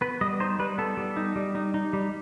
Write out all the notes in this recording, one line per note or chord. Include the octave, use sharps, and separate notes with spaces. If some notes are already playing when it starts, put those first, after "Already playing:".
B3 B4
G3 D#5
D#4 C5
G3 B4
B3 A4
G3
D#4
G3
D#4
D#4
G3